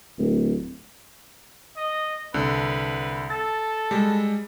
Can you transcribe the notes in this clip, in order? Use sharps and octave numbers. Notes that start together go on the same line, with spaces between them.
D1
D#5
C2 D3 B4
A4 A6
G3 G#3